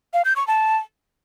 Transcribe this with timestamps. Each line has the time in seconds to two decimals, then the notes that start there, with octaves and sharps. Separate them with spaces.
0.14 F5
0.25 G6
0.36 C#6
0.47 A5